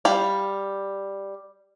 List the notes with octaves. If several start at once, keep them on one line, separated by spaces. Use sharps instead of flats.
G3 F5